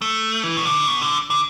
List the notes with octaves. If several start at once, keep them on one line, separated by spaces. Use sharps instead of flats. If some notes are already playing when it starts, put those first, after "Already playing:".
A3
E3
B2
D3
B2
D3
D3